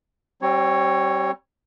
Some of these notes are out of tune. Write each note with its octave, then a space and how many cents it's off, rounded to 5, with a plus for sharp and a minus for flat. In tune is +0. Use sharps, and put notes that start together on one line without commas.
G3 -35 C4 +30 C#5 +0